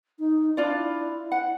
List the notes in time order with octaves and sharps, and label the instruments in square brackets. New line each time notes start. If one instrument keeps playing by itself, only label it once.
[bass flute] D#4
[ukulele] D4 F4 D5 [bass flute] E4
[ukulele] F#5